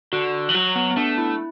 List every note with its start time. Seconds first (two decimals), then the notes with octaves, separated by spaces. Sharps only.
0.13 D3 F#4
0.49 E3
0.54 F#3 F#4
0.76 B3
0.91 B3
0.97 A3 D4
1.18 E4